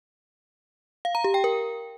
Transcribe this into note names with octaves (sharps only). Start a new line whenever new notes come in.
F5
A#5
G4
G5
A#4